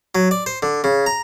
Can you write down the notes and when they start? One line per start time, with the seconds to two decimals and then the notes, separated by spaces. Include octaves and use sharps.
0.15 F#3
0.31 D5
0.46 C5
0.62 D3
0.84 C#3
1.06 A#5